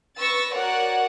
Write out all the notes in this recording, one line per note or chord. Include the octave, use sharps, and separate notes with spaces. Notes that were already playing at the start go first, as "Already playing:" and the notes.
B4 C#6 E6 A6 A#6
F#4 A#4 C#5 D5 F#5